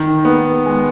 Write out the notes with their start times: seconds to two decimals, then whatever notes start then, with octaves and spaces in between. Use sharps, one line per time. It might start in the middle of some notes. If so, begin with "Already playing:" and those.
Already playing: D#3
0.25 B3
0.66 G#3